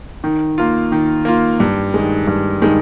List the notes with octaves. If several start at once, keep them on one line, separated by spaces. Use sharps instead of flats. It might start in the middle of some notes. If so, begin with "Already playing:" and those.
D#3
A#3 F4
D#3
A#3 F4
G2
D#3 G#3
G2
D#3 G#3